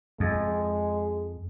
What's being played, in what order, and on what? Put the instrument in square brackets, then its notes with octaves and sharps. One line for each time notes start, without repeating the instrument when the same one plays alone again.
[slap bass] F2 [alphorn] G#3